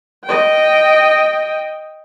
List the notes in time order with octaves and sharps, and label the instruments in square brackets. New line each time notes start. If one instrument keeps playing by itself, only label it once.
[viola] D#5 G5